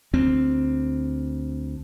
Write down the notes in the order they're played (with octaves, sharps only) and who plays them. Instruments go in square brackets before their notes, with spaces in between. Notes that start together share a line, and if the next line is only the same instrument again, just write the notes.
[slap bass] D2 C4